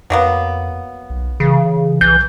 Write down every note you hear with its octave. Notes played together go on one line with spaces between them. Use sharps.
F2 F#3 A#3 B3
B1
C#3 E3
B1 E3 G6